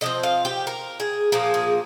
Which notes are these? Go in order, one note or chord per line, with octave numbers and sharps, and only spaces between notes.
D3 F3 C4 D#5
F5
G4
A#4
G#4
A#2 F3 A#3 G#4
G#4